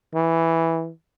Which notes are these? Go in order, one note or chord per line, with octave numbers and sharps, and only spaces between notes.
E3